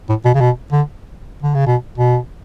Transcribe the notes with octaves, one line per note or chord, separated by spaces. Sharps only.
A2
B2
C#3
B2
D3
D3
C#3
B2
B2